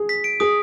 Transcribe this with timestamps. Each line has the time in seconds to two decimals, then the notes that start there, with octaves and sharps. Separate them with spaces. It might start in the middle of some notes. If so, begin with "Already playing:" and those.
Already playing: G#4
0.09 B6
0.24 D7
0.40 G#4 D#6